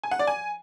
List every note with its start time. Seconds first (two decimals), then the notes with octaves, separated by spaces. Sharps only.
0.03 G#5
0.11 F#5
0.19 D5
0.27 G#5